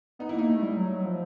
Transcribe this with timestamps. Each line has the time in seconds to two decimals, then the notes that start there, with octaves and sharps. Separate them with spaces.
0.19 B3 D#4
0.29 E4
0.34 A#3 D#4
0.48 A3
0.62 G3
0.77 F#3
1.05 F3